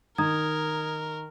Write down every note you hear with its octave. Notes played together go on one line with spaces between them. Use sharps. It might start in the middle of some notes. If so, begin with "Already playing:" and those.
D#3 A#4 A#5 D#6 G#6